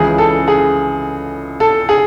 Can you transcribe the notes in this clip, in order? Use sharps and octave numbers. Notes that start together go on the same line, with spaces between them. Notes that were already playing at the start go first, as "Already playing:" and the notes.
Already playing: C#2 C#3 E3 G#4
A4
G#4
A4
G#4